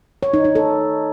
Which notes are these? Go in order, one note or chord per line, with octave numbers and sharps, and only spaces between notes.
C#5
D#4
D#4
A4